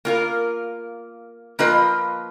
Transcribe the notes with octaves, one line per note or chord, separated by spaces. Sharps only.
A#3 F4 A#4
F3 A#3 F4 B4 D#5